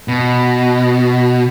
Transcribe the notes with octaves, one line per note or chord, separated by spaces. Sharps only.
B2